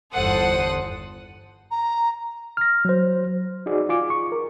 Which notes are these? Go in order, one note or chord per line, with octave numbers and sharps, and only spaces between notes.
G1 E2 A4 C5 F#5 D#6
A#5
F6 A#6
F#3 C5
D#4 F#4 G#4 D5
F4 G#5 D6
C#6
A#4